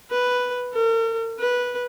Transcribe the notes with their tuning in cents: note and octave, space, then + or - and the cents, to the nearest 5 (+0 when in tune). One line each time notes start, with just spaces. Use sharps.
B4 +0
A#4 -45
B4 -10